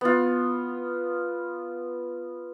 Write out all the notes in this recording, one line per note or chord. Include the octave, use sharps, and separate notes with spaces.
B3 F4